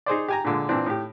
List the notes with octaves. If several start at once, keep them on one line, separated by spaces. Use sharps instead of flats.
D#4 G#4 C5 D5
G4 G#5 A#5
A#2 D3 G#3
A#2 E3 C4 D4
A2 G4